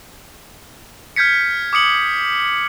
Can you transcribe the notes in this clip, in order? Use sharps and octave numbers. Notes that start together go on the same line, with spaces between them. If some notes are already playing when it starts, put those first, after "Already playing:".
F6 G6 G#6 B6 C#7
D6 D#6 C#7 F#7